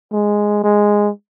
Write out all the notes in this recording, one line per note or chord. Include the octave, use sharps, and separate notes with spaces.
G#3
G#3